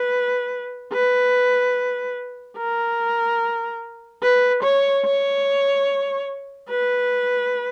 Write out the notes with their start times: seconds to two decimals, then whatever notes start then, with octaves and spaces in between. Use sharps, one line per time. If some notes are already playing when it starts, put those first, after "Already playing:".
Already playing: B4
0.93 B4
2.57 A#4
4.23 B4
4.63 C#5
5.05 C#5
6.70 B4